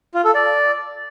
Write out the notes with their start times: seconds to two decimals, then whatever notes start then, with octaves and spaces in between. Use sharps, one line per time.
0.15 F4
0.25 A4
0.35 D5